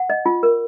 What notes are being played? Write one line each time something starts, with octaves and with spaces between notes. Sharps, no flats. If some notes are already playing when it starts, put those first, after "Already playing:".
Already playing: F#5
D#5
F4
A#4